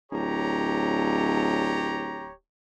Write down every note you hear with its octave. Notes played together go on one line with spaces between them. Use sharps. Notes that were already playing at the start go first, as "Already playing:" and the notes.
D1 G4 C#5 A#5